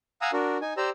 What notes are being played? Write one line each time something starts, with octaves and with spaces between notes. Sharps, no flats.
F5 F#5 G#5 A#5 D#6 E6
D4 F#4 A#4
D#4 G#5
G4 C5 D5 A#5 E6